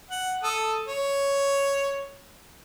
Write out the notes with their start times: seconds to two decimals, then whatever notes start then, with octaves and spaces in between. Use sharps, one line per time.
0.11 F#5
0.43 A4 D#6
0.88 C#5